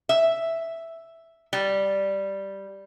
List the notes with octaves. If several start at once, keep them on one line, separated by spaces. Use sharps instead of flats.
E5
G3